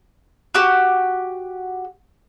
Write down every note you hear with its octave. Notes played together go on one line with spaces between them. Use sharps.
F#4 G4